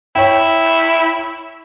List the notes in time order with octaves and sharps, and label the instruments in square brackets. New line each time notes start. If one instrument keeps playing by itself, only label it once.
[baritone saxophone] E4 [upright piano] C#5 G5